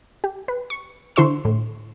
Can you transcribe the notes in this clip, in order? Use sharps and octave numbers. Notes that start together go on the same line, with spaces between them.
G4
B4
C#6
D3 E4 C5 C6 C#6 E6
A2